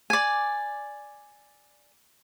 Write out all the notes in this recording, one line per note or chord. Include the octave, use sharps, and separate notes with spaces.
D5 G#5